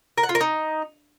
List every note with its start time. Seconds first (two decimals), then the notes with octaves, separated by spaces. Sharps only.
0.18 A#4
0.23 F#5
0.29 F4
0.35 A#4
0.41 D#4